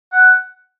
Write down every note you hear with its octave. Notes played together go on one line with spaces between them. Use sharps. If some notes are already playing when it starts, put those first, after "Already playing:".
F#5